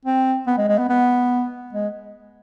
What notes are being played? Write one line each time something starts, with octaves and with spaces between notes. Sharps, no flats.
C4
B3
G#3
G#3
B3
B3
G#3